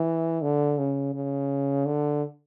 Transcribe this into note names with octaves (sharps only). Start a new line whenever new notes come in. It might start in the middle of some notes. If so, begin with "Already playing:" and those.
Already playing: E3
D3
C#3
C#3
D3